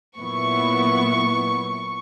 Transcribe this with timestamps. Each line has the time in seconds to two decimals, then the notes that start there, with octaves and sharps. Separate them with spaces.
0.17 A#2 F#3 B3 E4 C#6